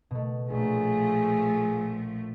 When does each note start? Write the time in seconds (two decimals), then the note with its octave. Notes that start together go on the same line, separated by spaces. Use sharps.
0.11 B2 A3
0.50 A#1 F3 A3 G#4